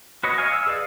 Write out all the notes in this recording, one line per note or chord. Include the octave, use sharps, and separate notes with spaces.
F#4 B4 C#5 D#5
C#5 D#5 F5 G#5
E6
G#4 B4 D5 F5